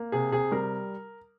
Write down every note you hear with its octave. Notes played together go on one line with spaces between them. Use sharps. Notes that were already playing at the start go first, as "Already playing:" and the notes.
Already playing: A#3
C3 G#4
C3 G#4
G3 A#4